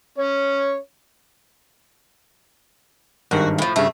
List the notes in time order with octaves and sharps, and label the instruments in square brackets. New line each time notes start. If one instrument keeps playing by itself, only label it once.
[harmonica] C#4 C#5
[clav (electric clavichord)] G#1 G2 D#3 [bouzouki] F#4
[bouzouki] A2 F3
[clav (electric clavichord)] G2 C#3 [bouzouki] A3